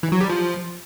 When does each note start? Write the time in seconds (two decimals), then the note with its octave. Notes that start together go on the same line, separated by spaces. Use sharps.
0.03 E3
0.12 F#3
0.21 G3
0.29 F3